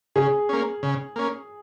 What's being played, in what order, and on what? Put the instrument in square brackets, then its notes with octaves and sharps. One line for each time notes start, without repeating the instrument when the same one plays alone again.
[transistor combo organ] C#3 [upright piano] G#4
[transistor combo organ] A#3 C#4
C#3
A#3 C#4